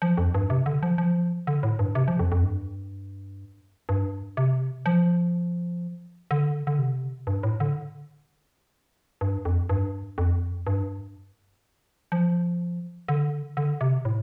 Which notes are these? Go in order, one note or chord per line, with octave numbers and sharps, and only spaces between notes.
F3
F2
G2
C3
D3
F3
F3
D3
A2
G2
C3
F3
F2
F2
G2
G2
C3
F3
D3
D3
C3
G2
A2
D3
G2
F2
G2
F2
G2
F3
D3
D3
C3
A2